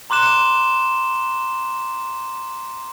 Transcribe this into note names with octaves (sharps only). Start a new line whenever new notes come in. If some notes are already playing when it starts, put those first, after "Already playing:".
A#5 C6 D6 F#6 E7 G7